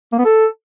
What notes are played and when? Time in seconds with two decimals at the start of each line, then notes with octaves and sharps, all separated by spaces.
0.12 A#3
0.19 B3
0.25 A4